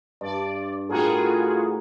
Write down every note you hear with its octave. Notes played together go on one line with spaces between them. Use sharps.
G2 D5
A2 F4 F#4 G#4 A#4 G5